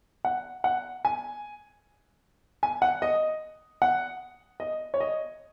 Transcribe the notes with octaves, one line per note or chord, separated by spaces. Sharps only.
F#5
F#5
G#5
G#5
F#5
D#5
F#5
D#5
C#5
D#5